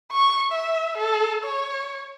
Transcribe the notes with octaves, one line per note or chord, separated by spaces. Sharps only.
C#6
E5
A4
C#5